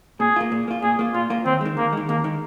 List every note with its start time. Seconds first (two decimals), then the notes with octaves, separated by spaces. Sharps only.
0.20 A#2 G#4
0.36 A#3 F4
0.52 A#2
0.68 A#3 F4
0.82 A#2 G#4
0.99 A#3 F4
1.14 A#2 F4
1.30 A#3 F4
1.45 D#2 C4
1.61 D#3 G#3
1.77 D#2 A#3
1.93 D#3 G#3
2.09 D#2 A#3
2.24 D#3 G#3